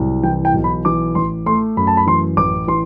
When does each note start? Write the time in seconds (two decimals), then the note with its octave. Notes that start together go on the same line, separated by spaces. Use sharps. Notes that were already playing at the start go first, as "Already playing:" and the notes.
Already playing: C2 F#3
0.23 E3 G5
0.45 G5
0.54 B1
0.64 B5
0.85 E3 D6
1.15 A1 C6
1.46 A3 C6
1.77 F#2 B5
1.87 A5
1.97 B5
2.07 E3 C6
2.37 A1 D6
2.68 E3 C6